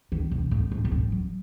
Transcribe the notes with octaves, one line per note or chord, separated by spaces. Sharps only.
D#3
B2
A2
G#2
B2
A2
F#3